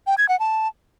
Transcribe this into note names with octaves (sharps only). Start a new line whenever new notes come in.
G5
G#6
F#5
A5